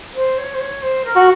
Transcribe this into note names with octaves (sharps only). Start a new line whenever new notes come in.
C5
C#5
C5
C#5
C5
A#4
F#4